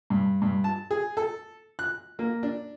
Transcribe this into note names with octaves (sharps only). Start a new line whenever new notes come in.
G2
G2
A5
G#4
A4
F#6
A#3
D4